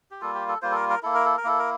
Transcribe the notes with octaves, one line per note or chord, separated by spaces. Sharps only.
G4
G3 A#3 F4 A4
G4
A4
G3 A#3 F4 C5
A4
A#4
A#4
A#3 E4 A4
A#4
A4
A#4
A#3 E4 A4
A#4